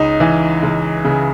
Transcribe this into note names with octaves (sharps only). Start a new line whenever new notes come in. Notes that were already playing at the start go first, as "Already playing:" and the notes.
Already playing: C#2 D#4
E3
C#2
C#3